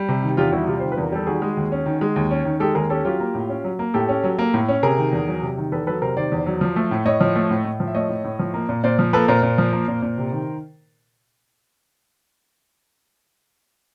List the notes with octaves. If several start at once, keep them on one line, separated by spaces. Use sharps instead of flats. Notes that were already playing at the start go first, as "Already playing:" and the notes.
Already playing: G3
C3
D#3
E2 F4 G4
G3 E4 F#4
C3 F4 G4
D#3 C5
B4
E2
A#4
G3 A4
D#3 F#4 G#4
G#3
D#2
C#4
D#3
G#3
D#2
C#4
D#3
G#3 G4 A4
D#2 G#4 A#4
C#4 G4 A4
F#3 F4 G4
A#3
A2
C#4
F#3
A#3
A2 G4 A4
C#4
F#3
A#3
A2
C#4
C3 G#4 A#4
D#3
E2
F#3
C3
D#3
E2 A4 B4
F#3 A4 B4
C3 A#4 C5
D#3 C5 D5
E2
F#3
F3
A3
A2
A2 C#5 D#5
F3
A3
A2
A2
F3
E5
A3 C#5 D#5
A2
A2
F3
A#3
A#2
A#2 C5 D5
F3
A#3 A4 B4
A#2 A#4 C5
A#2
F3
A#3
A#2
A#2
C3
D#3